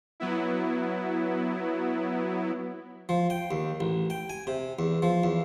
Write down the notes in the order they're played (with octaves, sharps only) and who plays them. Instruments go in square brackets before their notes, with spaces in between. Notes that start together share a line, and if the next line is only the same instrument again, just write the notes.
[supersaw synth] F#3 B3 E4
[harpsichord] F3
G5
D#2
A1
G5
G#5
C3
E2
F3
E2